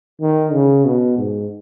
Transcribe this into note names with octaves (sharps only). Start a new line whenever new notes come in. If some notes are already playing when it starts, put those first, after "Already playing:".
D#3
C#3
B2
G#2